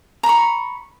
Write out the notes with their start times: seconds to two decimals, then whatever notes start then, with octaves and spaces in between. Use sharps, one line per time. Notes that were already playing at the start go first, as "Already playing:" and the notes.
0.23 A#5
0.26 B5
0.29 C#6